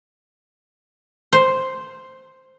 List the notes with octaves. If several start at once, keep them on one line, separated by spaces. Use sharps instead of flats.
C5